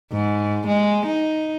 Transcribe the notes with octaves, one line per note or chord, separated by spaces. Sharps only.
G#2
G#3
D#4